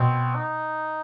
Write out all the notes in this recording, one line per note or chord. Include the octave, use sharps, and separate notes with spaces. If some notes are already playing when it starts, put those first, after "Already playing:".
Already playing: B2 C4
D#4